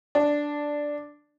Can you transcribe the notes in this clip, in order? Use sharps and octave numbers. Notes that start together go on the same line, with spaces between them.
D4